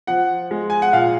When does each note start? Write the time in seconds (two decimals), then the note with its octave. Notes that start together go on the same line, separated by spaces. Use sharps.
0.07 F3 F#5
0.51 G#3
0.70 G#5
0.82 F#5
0.93 A#2 F5